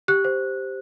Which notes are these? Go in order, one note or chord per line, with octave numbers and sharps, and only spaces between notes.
G4 F#6
C5